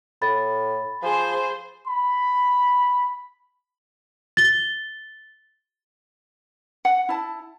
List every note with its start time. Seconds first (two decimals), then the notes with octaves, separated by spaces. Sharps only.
0.22 A2 B5 A6
1.02 F3 G#4 C5 G#5
1.87 B5
4.37 A6 G7
6.85 F#5
7.09 E4 A5